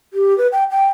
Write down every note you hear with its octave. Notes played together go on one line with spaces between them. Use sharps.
G4
B4
G5
G5